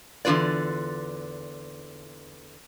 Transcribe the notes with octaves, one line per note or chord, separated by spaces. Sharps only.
E2 D3 G3 F4 B4 D5